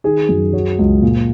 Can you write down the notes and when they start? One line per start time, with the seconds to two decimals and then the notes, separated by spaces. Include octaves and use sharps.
0.04 D#3 G#4
0.29 F#2
0.53 F#3
0.79 C#2
1.02 A#2